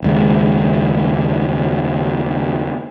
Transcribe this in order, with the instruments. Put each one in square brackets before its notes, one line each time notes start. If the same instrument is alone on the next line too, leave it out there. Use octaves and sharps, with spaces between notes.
[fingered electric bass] F#1 D#2 G#3